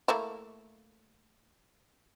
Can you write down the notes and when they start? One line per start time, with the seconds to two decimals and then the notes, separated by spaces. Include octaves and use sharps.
0.08 A3 A#3 E4